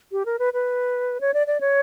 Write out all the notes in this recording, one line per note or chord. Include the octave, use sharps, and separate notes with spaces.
G4
A#4
B4
B4
C#5
D5
D5
C#5